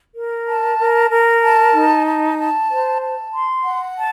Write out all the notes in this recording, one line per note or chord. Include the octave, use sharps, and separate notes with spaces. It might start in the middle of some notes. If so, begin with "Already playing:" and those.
A#4
A5
A#4
A#4
A5
D#4
A5
A5
C5
A5
C6
F#5
A5